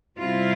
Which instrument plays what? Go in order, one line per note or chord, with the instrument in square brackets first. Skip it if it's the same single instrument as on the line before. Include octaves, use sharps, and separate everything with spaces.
[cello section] C3 G3 C4 E4 F4